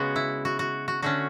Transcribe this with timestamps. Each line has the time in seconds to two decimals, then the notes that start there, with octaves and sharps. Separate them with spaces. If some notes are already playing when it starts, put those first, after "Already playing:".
Already playing: C#3 G#3 B3 F#4
0.16 E4
0.45 F#4
0.59 F#4
0.88 F#4
1.02 D3 A3 C#4 F#4